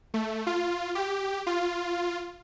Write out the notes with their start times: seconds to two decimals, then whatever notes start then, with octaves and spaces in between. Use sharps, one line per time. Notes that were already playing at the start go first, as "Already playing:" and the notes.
0.14 A3
0.47 F4
0.95 G4
1.47 F4